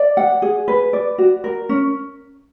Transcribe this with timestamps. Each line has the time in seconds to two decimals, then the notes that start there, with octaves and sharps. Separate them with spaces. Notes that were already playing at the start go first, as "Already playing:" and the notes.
Already playing: D5
0.17 F#5
0.42 G#4
0.68 B4
0.93 D5
1.18 F#4
1.44 A#4
1.69 C#4